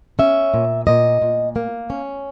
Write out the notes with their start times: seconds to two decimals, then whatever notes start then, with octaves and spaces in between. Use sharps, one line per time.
0.19 C#4 E5
0.54 A#2
0.87 A#2 D#5
1.22 A#2
1.56 A#3
1.90 C#4